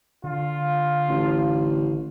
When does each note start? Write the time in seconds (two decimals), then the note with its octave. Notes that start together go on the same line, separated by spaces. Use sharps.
0.24 D3 F4
1.09 A1